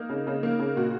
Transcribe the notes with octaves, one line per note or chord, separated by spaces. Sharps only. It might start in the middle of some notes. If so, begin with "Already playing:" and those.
Already playing: A#3 D#4
C#3
C#3
A#3
C#3
A#2 F#4